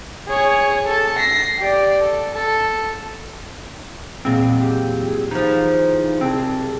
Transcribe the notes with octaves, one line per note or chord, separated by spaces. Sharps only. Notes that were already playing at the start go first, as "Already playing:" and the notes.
G#4 C#5
A4 A5
A#6 C7
G4 D5
A4
A4
E2 A#2 F#3 G#3 C4
G4
G#4
E3 F3 D#4
C2 C4 G#4 A5